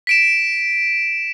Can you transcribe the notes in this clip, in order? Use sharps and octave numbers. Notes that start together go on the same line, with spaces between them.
B6 D7 E7